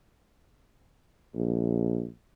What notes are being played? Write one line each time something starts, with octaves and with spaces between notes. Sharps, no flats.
A#1